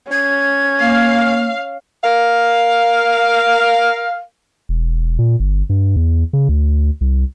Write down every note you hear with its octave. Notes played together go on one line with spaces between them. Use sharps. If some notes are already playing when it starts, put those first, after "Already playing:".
C#4 G#6
A#3 F5
A#4 F5
E1
A#2
G1
G2
E2
C#3
D2
C2